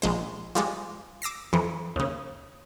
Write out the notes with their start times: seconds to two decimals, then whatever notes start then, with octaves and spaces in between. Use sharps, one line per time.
0.02 A#1 G#3 C5
0.55 F3 G3 G#3
1.22 D6 E6 A#6 C7
1.53 F2 E3
1.96 D#2 C#3